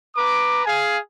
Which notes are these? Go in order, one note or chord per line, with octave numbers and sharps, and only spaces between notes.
B4 A#5 D6
G#4 F5 G#5